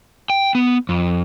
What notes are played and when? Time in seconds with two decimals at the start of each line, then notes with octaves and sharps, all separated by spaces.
0.30 G5
0.55 B3
0.89 F2